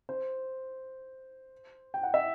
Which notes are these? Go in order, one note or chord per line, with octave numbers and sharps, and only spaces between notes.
C5
G5
F#5
E5